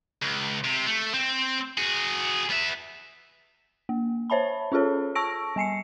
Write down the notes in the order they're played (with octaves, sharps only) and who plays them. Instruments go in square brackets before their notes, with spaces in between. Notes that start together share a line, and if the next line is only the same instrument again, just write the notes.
[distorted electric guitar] C#2
C3
A3
C4
F#4 G#4
B3 E5
[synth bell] A#3
C5 C#5 E5 A5 B5
C#4 F4 G#4 A4 C#5
A5 C#6 E6 A#6 D7
G3 G#5 C7 C#7